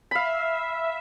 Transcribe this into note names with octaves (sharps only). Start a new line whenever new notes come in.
E5 F5 B5